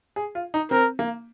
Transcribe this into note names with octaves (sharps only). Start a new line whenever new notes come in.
G#4
F4
D#4
C4 A#4
A#3